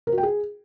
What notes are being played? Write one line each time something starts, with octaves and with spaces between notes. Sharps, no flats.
A#4
F#4
G5
G#4